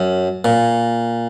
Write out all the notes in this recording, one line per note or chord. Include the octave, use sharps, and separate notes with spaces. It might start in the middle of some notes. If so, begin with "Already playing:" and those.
Already playing: F#2
A#2